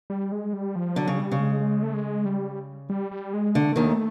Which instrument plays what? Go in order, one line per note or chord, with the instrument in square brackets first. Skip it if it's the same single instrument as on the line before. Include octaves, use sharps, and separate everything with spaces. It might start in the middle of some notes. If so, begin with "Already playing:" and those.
[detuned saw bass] G3
G#3
G3
F3
[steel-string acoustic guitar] D3 [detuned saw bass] F#3
[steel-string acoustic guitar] C#3
[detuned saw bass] G3
[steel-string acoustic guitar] C#3
[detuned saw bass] G#3
G#3
A3
G#3
G3
G3
G3
G#3
[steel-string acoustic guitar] D3 [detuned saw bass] A3
[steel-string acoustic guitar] D#2 D#3